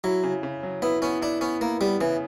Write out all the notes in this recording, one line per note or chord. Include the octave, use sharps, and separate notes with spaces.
F#3 E4
C#3
C#3
F#3
B3 E4
B3 C#4
D4 E4
B3 C#4
A#3 E4
G3 B3
C#3 E3